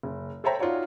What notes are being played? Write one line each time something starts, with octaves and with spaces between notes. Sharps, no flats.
F#1
A4 C5 C#5 E5 G5 A#5
D#4 F4 F#4 C#5 D5